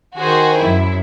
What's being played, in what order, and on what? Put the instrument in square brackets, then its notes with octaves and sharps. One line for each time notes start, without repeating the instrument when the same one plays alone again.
[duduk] D#3 [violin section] F#4 G#4 C5
[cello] F#2 [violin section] E4